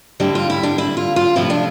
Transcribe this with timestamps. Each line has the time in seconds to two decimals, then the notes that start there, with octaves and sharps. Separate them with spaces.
0.20 D3 G3 C4 E4
0.35 F4
0.50 E4
0.63 D4
0.78 E4
0.97 F4
1.16 F4
1.36 C3 F3 A3 C4 E4
1.50 D4